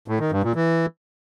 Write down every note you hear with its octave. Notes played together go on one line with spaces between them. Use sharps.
A2
D#3
G2
A#2
E3